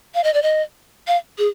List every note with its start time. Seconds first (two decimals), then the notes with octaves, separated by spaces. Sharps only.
0.15 F5
0.24 D#5
0.34 D5
0.43 D#5
1.07 F5
1.38 G#4